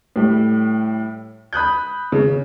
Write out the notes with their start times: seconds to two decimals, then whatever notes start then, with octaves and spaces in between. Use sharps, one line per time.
0.16 A2 G3
1.53 B5 D#6 F#6 G6
2.12 C#3